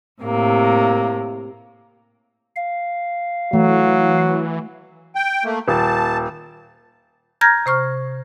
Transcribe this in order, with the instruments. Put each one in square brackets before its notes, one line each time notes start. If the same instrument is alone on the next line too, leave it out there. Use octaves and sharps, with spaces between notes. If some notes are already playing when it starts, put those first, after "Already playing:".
[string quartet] A2 C3 A#3
[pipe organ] F5
[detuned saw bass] E3 [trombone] F#3 [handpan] A3
[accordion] G5
A3 A#3
[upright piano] D#1 [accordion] A5
[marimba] A#5 F6 G6 G#6 A#6
C3 C5 C#6 F6